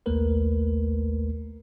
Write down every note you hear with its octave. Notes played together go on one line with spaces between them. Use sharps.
A#1 D#2 A3 A#3 A#4 B4